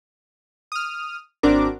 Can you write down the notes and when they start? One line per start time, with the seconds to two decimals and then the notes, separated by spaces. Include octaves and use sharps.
0.72 D#6 F6
1.43 G#1 C4 D4 F#4 A#4 D6